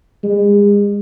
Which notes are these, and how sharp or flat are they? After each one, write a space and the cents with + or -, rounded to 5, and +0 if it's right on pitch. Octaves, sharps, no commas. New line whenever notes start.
G#3 -35